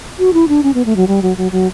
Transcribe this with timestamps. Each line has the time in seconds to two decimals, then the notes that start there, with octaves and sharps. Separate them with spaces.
0.19 F#4
0.33 E4
0.48 D4
0.63 C#4
0.74 B3
0.85 A3
0.96 F#3
1.08 G3
1.22 F#3
1.37 F#3
1.52 F#3